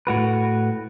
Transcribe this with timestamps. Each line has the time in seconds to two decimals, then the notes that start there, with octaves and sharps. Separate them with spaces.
0.07 A2 F#4 B4